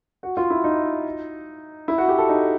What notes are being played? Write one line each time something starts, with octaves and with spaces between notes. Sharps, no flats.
F#4
F4
E4
D#4
E4
F#4
G4
A4
D#4